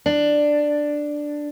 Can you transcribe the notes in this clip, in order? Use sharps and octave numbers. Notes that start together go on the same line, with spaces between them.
D4